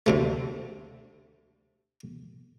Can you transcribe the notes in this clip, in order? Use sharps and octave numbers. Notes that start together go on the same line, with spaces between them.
D2 C3 A3